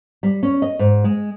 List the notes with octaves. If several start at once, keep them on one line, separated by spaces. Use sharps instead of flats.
G3
C#4
D#5
G#2
G#3